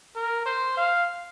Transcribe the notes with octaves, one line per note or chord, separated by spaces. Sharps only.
A#4
C5
F5